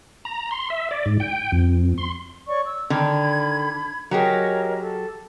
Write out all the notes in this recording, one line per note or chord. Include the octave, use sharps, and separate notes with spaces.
A#5
C6
E5
D5
G#2
G5
F2
C6
C#5 D5 C#6
E6
D3 D#3 B5 G#6
F#3 G4 G#4 A#4 C#5 D#5
A4